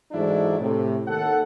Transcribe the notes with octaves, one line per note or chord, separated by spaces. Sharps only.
G#2 E3 F#3 A3 D4 E4
A2 C3
D#2 A4 F#5